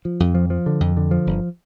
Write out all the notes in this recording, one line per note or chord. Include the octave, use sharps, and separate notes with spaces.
F3
F2
F3
F3
D3
F2
D3
F3
G1